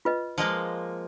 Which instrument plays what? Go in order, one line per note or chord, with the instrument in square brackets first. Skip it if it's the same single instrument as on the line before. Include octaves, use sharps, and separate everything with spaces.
[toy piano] F4 B4 D#5
[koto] F3 G#3 A#3